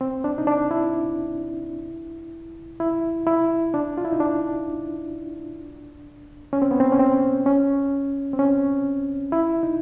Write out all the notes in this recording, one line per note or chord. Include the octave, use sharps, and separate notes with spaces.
C4
D4
D#4
D4
E4
E4
E4
D4
F4
E4
D#4
D4
C#4
C4
B3
C4
C#4
C4
C#4
C4
C#4
E4
D#4